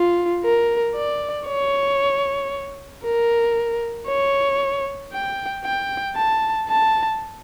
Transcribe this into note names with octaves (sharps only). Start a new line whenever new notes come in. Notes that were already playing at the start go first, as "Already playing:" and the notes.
Already playing: F4
A#4
D5
C#5
A#4
C#5
G5
G5
A5
A5